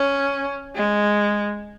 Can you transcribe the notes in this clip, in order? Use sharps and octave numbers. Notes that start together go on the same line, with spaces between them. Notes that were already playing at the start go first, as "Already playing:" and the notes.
Already playing: C#4
G#3